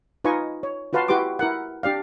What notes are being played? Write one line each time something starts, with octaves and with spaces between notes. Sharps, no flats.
D#4 F4 B4 D#5 G#5 C#6
C#5
F4 F#4 B4 F5 A5 C6
E4 F#4 G4 B4 C6 D6
E4 A#4 F#5
D4 G4 D5 F5